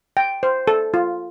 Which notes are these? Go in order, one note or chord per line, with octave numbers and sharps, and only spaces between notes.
G5
C5
A4
F4